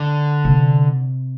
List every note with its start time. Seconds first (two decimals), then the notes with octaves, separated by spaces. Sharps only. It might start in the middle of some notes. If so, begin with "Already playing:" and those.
Already playing: D3
0.45 C3